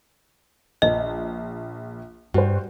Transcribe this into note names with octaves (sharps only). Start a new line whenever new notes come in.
A#1 D#5
G2 F#4 C5